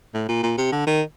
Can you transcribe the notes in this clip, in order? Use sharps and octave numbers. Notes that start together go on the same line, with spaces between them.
A2
A#2
A#2
C3
D3
D#3